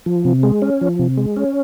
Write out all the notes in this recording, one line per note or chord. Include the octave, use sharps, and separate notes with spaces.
F3
C3
G#3
C#4
F3
C3
G#3
C#4